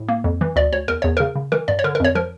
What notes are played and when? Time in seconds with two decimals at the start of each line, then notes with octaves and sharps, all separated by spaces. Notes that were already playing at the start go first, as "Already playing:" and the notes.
Already playing: A2
0.08 A#3
0.24 F2
0.41 E3
0.56 D2 D5
0.72 D2 C#5
0.88 E2 A#4
1.02 E2 C#5
1.17 C#3 A#4
1.35 C#3
1.52 E3 A#4
1.68 G2 D5
1.79 C#5
1.84 D3 A#4
1.95 A#4
2.00 F2 C#5
2.15 F3 A#4